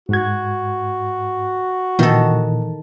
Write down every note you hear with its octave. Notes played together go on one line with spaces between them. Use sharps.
G#2 F#4 G#6
A#2 D#3 E3 A4